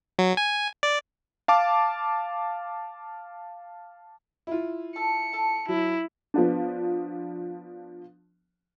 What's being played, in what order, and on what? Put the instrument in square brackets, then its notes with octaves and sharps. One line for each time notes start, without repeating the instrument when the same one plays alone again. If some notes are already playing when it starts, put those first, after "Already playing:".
[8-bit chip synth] F#3
G#5
D5
[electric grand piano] F5 A5 D6
[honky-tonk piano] E4 F4
[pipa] A4 [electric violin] C#7
[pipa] A4
[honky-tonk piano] F#3 [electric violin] E4
[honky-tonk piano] F3 B3 D4